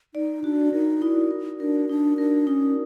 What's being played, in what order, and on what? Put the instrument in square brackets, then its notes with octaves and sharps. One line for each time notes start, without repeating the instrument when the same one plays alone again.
[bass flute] D#4 [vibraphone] D5
[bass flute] D4 [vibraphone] F#4
[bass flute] D#4 [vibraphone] A#4
[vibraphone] D#4 [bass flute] E4
[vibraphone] A#4
[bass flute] D4 [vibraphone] A#4
[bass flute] D4 [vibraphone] D#4
[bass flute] D4 [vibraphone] A#4
[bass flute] C#4 [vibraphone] D#4